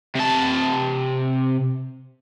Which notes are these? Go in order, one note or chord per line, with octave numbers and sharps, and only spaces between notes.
C3 A5